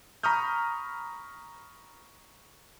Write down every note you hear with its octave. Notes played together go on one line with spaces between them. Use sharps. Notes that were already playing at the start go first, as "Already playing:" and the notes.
A#5 B5 C#6 D#6 F6 G6